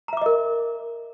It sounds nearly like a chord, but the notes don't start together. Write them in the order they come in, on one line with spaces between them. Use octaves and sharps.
A#5 E5 D6 D#5 A#4